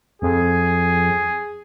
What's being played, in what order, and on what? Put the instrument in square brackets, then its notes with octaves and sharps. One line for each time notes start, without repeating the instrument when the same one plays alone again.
[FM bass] F2 [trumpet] G#4